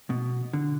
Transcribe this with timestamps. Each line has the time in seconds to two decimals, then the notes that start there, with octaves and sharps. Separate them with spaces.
0.10 B2
0.53 D3